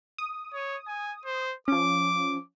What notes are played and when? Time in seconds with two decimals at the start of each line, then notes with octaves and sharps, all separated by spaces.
0.18 D#6
0.54 C#5
0.87 G#5
1.25 C5
1.68 F3 C#4 D6